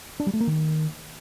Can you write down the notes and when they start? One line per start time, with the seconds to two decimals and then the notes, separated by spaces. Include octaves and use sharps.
0.20 D4
0.27 G3
0.33 A3
0.40 A#3
0.47 D#3